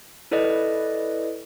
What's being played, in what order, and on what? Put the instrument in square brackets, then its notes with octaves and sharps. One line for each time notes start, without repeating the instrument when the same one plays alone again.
[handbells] E4 A4 B4 D5 D#5